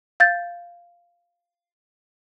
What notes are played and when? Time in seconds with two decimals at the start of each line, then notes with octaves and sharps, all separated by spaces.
0.20 F5 G6 A6